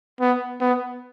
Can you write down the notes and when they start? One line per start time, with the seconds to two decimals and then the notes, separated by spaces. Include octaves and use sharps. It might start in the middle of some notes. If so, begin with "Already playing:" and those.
0.20 B3
0.61 B3